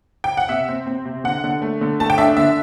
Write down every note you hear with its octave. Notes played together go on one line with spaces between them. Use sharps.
G5
F#5
C3 E5
C4
C4
C3
D3 F#5
D3
A3
D3
A3 A5
G5
D4 E5
D3 E5